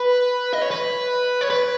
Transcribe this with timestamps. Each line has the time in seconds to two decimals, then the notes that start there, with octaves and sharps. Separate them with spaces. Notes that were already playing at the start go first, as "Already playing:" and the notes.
Already playing: B4
0.53 D#5
0.62 C#5
0.71 B4
1.41 C#5
1.50 B4